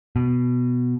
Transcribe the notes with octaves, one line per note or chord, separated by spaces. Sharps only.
B2